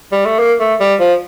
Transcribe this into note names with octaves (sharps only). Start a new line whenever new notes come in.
G3
A3
A#3
A3
G3
F3